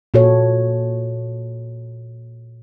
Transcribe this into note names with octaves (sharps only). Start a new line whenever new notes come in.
A#2 F#4 A4 C#5